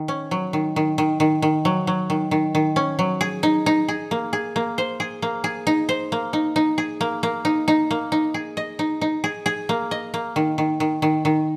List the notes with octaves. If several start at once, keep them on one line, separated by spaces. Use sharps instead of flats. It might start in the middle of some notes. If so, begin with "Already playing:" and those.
Already playing: D#3
C#4
F#3
D#3
D#3
D#3
D#3
D#3
F#3
F#3
D#3
D#3
D#3
C#4
F#3
G#4
D#4
D#4
G#4
A#3
G#4
A#3
C5
G#4
A#3
G#4
D#4
C5
A#3
D#4
D#4
G#4
A#3
A#3
D#4
D#4
A#3
D#4
G#4
D#5
D#4
D#4
G#4
G#4
A#3
D#5
A#3
D#3
D#3
D#3
D#3
D#3